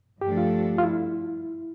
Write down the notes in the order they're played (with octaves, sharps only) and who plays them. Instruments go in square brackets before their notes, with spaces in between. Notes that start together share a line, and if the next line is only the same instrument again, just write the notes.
[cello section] G2 F3 A3 D4 A4 [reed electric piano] G4
[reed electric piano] F4
F4
E4